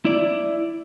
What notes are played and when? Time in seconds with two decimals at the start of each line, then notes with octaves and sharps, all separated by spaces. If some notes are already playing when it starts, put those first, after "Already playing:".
0.05 E4 D5